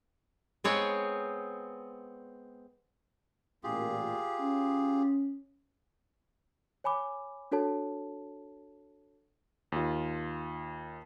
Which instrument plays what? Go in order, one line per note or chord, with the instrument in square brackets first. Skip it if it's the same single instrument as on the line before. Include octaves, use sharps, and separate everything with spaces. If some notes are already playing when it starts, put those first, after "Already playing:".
[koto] G#3 B3 C4 G#4 C#5
[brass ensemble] A1 A#2 [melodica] F4 G4 G#4
[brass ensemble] C#4
[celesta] C#5 G#5 B5 D6
D4 F#4 A4 C#5 A5
[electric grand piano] D#2 F4